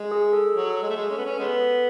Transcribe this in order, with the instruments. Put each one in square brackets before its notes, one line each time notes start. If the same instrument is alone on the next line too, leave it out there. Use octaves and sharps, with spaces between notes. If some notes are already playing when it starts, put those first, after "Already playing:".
Already playing: [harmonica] G#3
[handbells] G#4
A4
[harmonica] F#3
G#3
A3
G#3
C#4
B3
C#4
G#3 B3